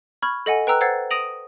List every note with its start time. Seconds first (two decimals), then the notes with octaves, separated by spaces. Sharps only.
0.22 B5 C#6 F6 G#6
0.46 A4 D#5 F#5 G#5
0.67 B4 G5 A#5 E6 F#6
0.81 C5 F#5 E6 G#6 A6 C7
1.10 D#6 A#6 D7 D#7 F7 F#7